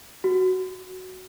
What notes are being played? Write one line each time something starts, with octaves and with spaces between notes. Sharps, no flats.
F#4